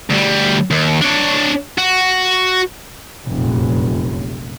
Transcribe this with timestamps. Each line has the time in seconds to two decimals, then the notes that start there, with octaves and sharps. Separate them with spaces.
0.10 D2 G3
0.71 D#2
1.02 D4 C#5
1.78 F#4
3.27 F1 A#1 F#2